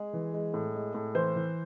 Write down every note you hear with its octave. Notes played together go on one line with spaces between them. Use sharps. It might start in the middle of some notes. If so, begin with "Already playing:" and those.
Already playing: G#3 G#4
E3
G#3
A2
G#3
A2
E3 C5
E3